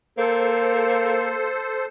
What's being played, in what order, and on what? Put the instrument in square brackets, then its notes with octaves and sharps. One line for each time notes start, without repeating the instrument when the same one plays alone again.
[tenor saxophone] A#3 [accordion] A4 C5